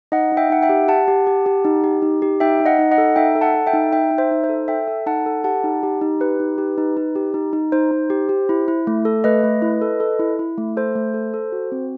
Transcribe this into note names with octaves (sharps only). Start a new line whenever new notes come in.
D#4 D#5 F#5
D#4
E5 G5
D#4 F#5
E5 G5
G4
G4 F#5 A5
G4
G4
G4
D#4
G4
D#4
G4
D#4 E5 G5
D#4
D#5 F#5
D#4
D#5 F#5
A4
D#4 E5 G5
A4
F#5 A5
A4
E5 G5
D#4
D#4 E5 G5
D#4
C5 E5
D#4
C5
A4
A4 E5 G5
A4
D#4 F#5 A5
A4
G4 F#5 A5
D#4
G4
D#4
G4 B4
D#4
G4
D#4
D#4
G4
D#4
D#4
D#4 C5
D#4
G4
G4
E4
E4
A3
A4
A3 B4 D#5
A3
E4
A4
A4
E4
E4
A3
A4 C5
A3
A4
A4
F#4
C4